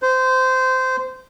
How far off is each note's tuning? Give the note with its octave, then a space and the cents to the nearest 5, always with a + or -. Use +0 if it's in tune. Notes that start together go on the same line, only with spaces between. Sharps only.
C5 -20